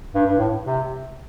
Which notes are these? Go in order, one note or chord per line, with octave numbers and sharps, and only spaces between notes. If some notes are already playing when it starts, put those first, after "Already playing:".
G2
G2
A2
C3